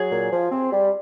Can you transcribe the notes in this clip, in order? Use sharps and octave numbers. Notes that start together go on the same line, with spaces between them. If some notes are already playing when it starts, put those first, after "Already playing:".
Already playing: F#3 G#4
A#2
F3
C4
G3